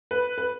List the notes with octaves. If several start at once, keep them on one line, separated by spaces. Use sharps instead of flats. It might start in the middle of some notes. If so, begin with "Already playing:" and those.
B4
B4